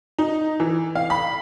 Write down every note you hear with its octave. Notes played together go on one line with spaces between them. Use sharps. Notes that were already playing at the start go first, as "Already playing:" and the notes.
D#4
E3
F5
B5